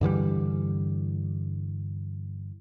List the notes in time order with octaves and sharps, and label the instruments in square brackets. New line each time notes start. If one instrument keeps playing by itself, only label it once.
[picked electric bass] G2 D3 E3 G3